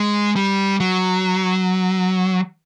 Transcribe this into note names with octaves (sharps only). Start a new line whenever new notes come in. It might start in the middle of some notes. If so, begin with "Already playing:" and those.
Already playing: G#3
G3
F#3